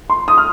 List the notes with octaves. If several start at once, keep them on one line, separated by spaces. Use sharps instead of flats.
C6
D#6
F6